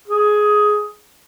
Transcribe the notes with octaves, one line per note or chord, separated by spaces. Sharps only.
G#4